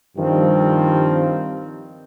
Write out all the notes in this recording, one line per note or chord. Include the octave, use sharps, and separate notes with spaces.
G2 D#3 F3 G3 C4